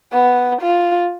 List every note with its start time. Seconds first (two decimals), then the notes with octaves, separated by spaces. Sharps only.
0.13 B3
0.62 F4